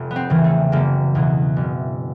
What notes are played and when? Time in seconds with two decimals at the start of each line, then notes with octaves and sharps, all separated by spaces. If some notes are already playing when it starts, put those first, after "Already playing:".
Already playing: F1
0.11 B3
0.16 C4
0.30 E2 C#3 E3
0.44 A3
0.72 F#1 A#3
1.15 E2 B2
1.57 F#1